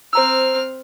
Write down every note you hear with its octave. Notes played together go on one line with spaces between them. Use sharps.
C4 C5 A#5 E6 F6